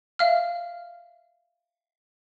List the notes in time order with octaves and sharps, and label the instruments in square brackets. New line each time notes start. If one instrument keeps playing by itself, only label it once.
[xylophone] E5 F5 F6